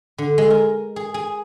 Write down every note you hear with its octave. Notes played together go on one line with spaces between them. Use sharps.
D3
G#3
A#4
G#4
G#4